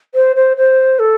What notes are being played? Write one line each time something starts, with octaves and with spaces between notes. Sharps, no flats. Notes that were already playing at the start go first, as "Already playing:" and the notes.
C5
C5
C5
A4